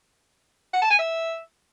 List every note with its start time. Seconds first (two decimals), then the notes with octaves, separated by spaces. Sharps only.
0.74 F#5
0.82 A5
0.91 G#5
0.99 E5